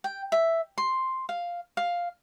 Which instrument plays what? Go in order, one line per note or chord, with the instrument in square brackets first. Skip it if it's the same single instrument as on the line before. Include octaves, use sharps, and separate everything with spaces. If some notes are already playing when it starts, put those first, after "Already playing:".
[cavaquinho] G5
E5
C6
F5
F5